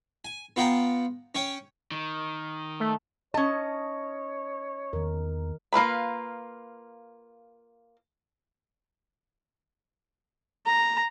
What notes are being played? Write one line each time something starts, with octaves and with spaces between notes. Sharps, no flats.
G#5
B3 F4 F#5 G5 A#5
C#4 C#5 G5
D#3
A3
C#4 C#5 D#5 A5
E2 D#3 A#4
A#3 F4 B4 B5
A#5